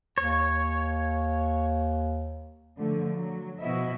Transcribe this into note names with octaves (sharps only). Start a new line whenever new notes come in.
D#2 C#5
D3 F3 A3
F#3
B2 F3 E4 F#4 D#5 E5